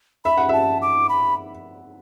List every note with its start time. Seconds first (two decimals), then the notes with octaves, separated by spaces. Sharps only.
0.25 E5 B5
0.37 F#5
0.49 E5 A5
0.82 D6
1.09 B5